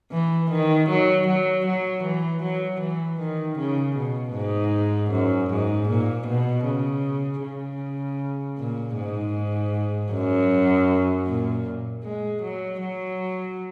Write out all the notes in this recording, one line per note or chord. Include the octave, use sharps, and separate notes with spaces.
E3
D#3
F#3
F#3
F#3
E3
F#3
E3
D#3
C#3
B2
G#2
F#2
G#2
A#2
B2
C#3
C#3
A#2
G#2
F#2
A#2
G#3
F#3
F#3